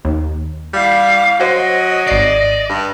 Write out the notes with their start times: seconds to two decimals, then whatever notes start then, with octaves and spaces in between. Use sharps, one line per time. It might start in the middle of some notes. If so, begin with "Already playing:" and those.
0.05 D#2
0.73 G3 E4 F5 D6
1.40 F#3 C5 D#5 F#5
2.07 G#1 D5 C7
2.69 G2